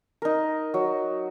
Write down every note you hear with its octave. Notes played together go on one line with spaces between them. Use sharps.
D#4 A#4
F#3